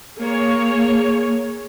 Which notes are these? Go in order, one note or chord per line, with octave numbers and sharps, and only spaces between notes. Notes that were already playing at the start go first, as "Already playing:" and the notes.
A#3 G#4 C#5